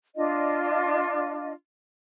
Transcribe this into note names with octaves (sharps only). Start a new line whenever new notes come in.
D4 F4 D#5